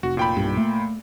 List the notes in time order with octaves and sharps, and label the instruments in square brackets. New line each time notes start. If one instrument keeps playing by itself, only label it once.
[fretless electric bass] F1 [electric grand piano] F#4
[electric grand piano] A#2 G5 B5
[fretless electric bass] B1 G2
A3 A#3